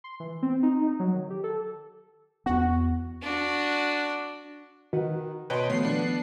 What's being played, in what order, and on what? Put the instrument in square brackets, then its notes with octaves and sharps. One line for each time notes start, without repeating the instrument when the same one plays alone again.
[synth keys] C6
E3
C4
D#4
D#4
F#3
D#3
G4
A4
[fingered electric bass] E2 B3 [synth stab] F#4
[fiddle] D4 F#4
[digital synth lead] D#3 [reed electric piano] F#4 [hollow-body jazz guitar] B4 F#5
[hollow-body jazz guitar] B2 A5 C6 [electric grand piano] B4 C#5 D#5 [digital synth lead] G5
[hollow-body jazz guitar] D#3 F3 A3 [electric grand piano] B3 [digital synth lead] C7
[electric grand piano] B3 D4